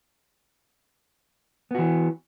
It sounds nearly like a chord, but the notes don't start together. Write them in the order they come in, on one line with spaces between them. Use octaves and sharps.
B3 F#4 E3